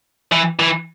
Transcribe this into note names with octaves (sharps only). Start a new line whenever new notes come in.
E3
E3